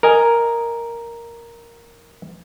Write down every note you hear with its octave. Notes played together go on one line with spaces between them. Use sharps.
A#4 D#5 G#5